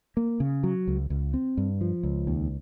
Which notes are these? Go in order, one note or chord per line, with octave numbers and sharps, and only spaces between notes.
A#3
C#3
F#3
C#2
C#2
C4
G2
F3
C#2
D#2